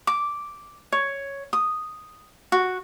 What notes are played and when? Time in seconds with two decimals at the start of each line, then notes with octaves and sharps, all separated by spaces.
0.07 D6
0.92 C#5
1.53 D#6
2.52 F#4